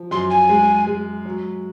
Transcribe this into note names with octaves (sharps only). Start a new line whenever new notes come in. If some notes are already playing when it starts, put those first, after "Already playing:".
Already playing: F3
F#2 C6
G#5
G#3
G#3
F#3